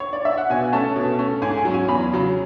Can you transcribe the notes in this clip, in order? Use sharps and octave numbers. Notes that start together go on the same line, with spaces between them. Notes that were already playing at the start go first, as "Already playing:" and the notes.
C#5
D5
E5
F#5
B2 G#5
A3 C#4 A5
B2
A3 C#4
G#2 G#5
G#5
F#3
C#4 G#5
E2 B5
C#3 F#3